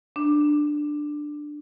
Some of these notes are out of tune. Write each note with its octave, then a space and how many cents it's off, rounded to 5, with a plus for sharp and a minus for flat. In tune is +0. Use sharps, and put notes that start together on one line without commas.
D4 +10